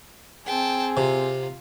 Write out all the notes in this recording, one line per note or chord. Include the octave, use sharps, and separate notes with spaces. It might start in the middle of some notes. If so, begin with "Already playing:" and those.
C4 G#4 G5 A5
C3 F4